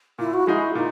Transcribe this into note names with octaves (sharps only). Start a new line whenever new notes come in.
A#2 E4
F#4
G#3 D#4 E4 F#4 G#4
A#2 D#4